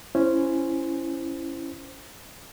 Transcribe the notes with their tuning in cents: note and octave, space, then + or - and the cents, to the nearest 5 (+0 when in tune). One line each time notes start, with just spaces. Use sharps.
C#4 +0 E4 +15 C5 +0